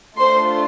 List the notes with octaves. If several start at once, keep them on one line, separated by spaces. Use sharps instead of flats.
A3 D4 F4 A4 C5 C6